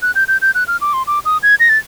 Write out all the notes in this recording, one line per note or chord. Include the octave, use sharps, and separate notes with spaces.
F#6
G6
G6
G6
F#6
F6
D6
C6
D6
D#6
G#6
A#6
A6